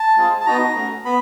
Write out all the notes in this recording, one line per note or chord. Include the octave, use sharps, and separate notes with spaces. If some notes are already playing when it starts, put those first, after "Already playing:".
Already playing: A5
G#3 C4 F4 G#4
A5
B3 D#4 F#4 A#5
A3 C#4 F#4
B3 B5